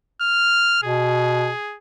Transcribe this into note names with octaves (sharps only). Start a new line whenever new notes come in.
F6
B2 G#4